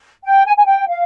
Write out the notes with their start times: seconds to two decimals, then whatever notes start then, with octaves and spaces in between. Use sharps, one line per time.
0.23 G5
0.45 G#5
0.57 G#5
0.66 G5
0.87 F5